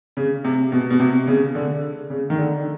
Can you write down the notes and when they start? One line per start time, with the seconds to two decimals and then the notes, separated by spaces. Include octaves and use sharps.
0.17 C#3
0.44 C3
0.72 B2
0.91 B2
1.00 C3
1.27 C#3
1.55 D3
2.10 C#3
2.30 D#3
2.38 D3